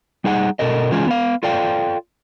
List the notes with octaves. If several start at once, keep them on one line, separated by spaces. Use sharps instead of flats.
G3 D#4 G#4 F#5
B2 A4 A#4 D#5
E3 G#3 C#4 F4 G#4
B3 F5
F4 A4 D5 F5 G5